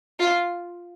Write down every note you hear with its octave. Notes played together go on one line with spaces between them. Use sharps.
F4